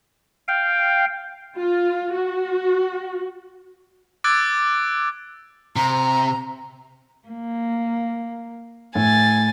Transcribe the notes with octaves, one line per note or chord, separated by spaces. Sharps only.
F5 G5
F4
F#4
D6 E6 F#6 G#6 A6 D7
C3 A#5
A#3
A2 G#5 A6